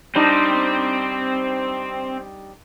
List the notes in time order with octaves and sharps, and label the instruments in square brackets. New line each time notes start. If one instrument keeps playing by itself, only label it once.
[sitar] G3 D4 D#4 [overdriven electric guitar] C4 C5